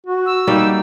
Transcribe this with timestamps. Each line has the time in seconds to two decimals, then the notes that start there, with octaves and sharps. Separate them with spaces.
0.06 F#4
0.26 E6
0.47 G3 A#3 D#4